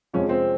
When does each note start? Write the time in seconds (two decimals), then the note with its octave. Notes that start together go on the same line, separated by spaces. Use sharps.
0.13 F2 C3 F3 G#3 C#4
0.29 C4